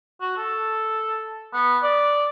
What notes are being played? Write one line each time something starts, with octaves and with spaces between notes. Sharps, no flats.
F#4
A4
B3
D5